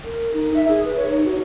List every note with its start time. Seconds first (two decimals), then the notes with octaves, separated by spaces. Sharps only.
0.04 A#4
0.33 D#4
0.55 E5
0.68 G#4
0.84 B4
0.97 C#5
1.08 D#4
1.25 F#4